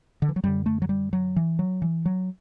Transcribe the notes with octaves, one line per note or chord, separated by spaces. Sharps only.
D3
E3
F#3
F#2 D3 G3
A3
F#3
G3
F#3
E3
F#3
E3
F#3